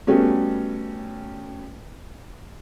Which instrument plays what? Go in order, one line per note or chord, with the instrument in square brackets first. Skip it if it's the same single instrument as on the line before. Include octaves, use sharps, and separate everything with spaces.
[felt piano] G3 A3 B3 C#4 F#4